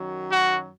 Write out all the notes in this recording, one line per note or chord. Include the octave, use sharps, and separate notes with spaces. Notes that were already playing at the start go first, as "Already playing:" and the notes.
Already playing: F#2 D#3 F#3
F#4